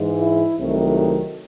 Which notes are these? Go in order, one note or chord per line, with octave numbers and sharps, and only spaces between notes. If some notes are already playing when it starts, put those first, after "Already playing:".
Already playing: G#2 E3 G#3
E4
C2 C3 D#3 F#3 A3